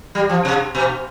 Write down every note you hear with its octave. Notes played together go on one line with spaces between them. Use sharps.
G3
F3
C3
B2